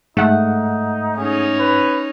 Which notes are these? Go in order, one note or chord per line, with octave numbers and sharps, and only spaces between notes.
G#2 A3 D#4 F#5
C#4 D#4 G#4
B4